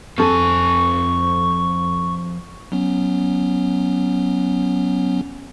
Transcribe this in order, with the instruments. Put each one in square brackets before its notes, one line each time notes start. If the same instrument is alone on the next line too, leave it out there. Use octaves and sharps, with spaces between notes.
[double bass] F2 [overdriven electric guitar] F3 G#5 [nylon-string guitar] C4 A4 [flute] C#6
[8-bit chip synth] F#3 B3 C#4